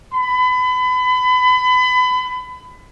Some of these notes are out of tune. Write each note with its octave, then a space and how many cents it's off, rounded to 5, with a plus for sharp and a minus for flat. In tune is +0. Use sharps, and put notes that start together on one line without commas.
B5 +30